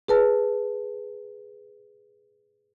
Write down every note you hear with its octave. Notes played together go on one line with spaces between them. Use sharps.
G#4 B4 A5